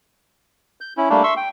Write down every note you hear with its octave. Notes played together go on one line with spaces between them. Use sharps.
G6
C#4 E4
G3 A3 A#3 D4
E5 C6 C#6 E6
G5